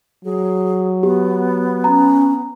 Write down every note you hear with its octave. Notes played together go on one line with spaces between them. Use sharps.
F#3 G#4
B3 G4
C#4 A#5